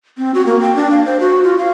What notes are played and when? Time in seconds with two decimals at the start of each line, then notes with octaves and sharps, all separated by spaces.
0.18 C4
0.34 F#4
0.46 A#3
0.61 G5
0.76 D4
0.91 F5
1.06 C5
1.20 F#4
1.44 F4
1.58 F5